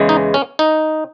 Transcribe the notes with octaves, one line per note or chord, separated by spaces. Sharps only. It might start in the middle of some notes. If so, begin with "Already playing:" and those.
Already playing: E2 C#3 E3 G#3
D#4
C#4
D#4